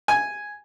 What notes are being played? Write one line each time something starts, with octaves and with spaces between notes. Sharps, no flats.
G#5